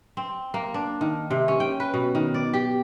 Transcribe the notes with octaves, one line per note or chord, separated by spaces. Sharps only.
C4
A#3
D4
D#3
C3
C#4
G5
B4
B2
D#3
D5
G4